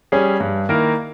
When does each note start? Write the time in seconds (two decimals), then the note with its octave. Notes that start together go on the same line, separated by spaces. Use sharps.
0.12 G3 C#4 G#4
0.40 G2
0.69 D#3 A#3 E4 A#4